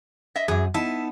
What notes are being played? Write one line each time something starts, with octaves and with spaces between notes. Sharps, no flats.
D#5 E5
F#2 E3 G#4
B3 D#4 E4 A5